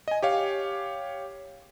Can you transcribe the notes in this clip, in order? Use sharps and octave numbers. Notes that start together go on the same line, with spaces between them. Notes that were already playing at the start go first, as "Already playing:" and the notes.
D#5 G#5
G4 C#5 F5